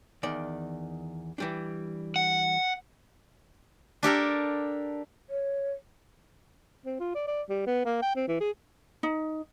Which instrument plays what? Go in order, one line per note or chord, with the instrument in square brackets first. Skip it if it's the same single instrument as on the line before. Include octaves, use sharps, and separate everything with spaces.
[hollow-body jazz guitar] E2 D#3 D5
E3 G3 D4
[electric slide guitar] F#5
[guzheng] D4 G4 A4 A#4
[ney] C#5
[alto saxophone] C4
F4
D5
D5
G3
B3
A#3
G5
C4
E3
G#4
[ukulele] D#4